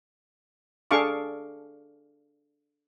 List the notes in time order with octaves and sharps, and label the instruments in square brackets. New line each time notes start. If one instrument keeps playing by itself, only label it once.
[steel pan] D4 G#4 A4 F5 C#6 D6